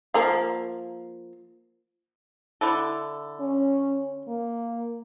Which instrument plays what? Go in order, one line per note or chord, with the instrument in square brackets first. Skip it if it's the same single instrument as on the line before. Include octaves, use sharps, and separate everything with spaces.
[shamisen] F3 A#3 F5
[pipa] D3 E4 A4
[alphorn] C#4
A#3